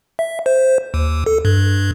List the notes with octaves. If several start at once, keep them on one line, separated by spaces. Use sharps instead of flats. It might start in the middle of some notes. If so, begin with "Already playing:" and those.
E5
C5
D#2
A4
G2